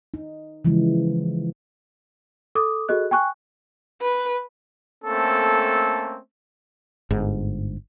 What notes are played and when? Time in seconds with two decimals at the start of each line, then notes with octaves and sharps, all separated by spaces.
0.14 D#4
0.65 C#3 E3 F3 G#3
2.55 A4 D6 D#6
2.89 F#4 G#4 A4 D#5 F#6
3.11 G5 G#5 C#6 F#6
4.01 B4
5.04 A3 A#3 C4 C#4 A4
7.11 G1 G#2